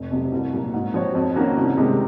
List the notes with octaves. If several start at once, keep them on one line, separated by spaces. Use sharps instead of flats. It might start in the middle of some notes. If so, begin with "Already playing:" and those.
Already playing: F1
F2 C3 F#3
C2
A#2 F#3 A#3
G#2
F3 C4 F#4 C#5
F2
D#3 A#3 C#4 F#4
C2
C3 D#3 G#3 D#4